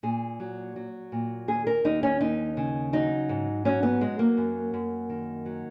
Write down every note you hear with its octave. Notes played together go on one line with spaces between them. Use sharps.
A#2 G#4
F#3
F#3
A#2
D#2 G#4
A#4
D#2 D#4
C#4
D#2 D#4
C#3
F#3 D#4
G#2
F#3 C#4
B3
F#3 G#3
A#3
F#2
F#2
D#3
F#3